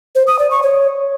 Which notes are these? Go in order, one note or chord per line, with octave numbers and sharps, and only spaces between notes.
C5
D#6
D5
C#6
C#5